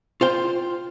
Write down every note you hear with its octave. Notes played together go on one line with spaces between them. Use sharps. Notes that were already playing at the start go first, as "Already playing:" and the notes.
F4 C5 G5